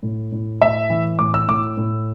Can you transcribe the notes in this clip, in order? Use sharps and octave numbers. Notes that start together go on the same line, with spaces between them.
A2
A2
A2 E5
E3
A2 D6
E6
A2 D6
A2